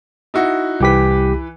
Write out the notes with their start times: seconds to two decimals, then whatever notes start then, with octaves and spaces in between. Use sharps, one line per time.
0.34 D#4 E4 F#4
0.80 C2 E3 G4 B4 B6